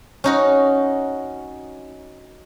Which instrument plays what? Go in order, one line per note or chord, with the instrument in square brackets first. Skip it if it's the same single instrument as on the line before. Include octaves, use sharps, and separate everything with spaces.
[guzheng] C#4 D#4 F#4